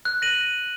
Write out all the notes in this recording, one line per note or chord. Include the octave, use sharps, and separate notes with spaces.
F#6
A#6 D#7 F#7